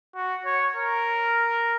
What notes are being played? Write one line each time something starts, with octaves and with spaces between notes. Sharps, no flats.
F#4
C#5
A#4